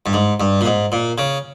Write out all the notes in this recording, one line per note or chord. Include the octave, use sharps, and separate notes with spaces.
G2
G#2
G2
A#2
G#2
A#2
C#3